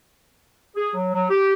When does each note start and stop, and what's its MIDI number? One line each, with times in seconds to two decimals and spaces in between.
0.75 0.89 68
0.94 1.11 54
1.13 1.24 54
1.29 1.52 67